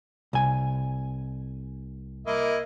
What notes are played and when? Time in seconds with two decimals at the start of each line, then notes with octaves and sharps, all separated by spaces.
0.33 C2 G#5
2.26 A#3 E4 D#5